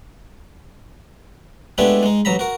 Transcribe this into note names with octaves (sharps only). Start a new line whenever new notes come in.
G#3 A3 B3 D4 E4 G4
G#3 D#4
A1 F#3 A#5 B5
F#4 A#4